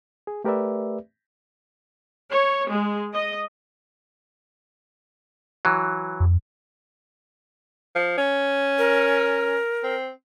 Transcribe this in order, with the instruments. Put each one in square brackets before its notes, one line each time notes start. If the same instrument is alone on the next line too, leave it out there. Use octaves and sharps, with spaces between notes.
[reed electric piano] G#4
A3 G4 A#4 B4 D5 E5
[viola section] C#5
G#3
D#5
[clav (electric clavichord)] E3 F#3
[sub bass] F2
[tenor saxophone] F3
C#4
[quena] A#4
[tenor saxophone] C4